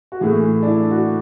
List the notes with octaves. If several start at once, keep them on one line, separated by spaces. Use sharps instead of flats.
F#4
A2 E3 G#4
D4
E4
F#4